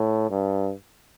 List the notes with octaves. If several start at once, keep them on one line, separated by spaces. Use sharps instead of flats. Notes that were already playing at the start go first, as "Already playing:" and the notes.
Already playing: A2
G2